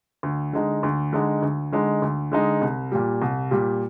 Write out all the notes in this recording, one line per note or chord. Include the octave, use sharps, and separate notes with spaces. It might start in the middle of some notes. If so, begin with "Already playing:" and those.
D2
D3 G#3 D#4
D2
D3 G#3 D#4
D2
D3 G#3 D#4
D2
D3 G#3 D#4
C2
A#2 G3
C2
A#2 G3